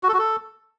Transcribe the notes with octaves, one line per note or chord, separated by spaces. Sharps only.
F#4
A4
F#4
A4